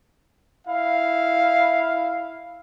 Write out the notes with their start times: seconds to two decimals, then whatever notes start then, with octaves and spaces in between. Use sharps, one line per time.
0.67 E4 F5